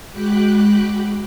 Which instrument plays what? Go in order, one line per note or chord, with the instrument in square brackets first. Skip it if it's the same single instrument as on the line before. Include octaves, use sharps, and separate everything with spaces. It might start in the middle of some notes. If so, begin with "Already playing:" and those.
[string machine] G#3 F#4 G5 B5 D6 F#6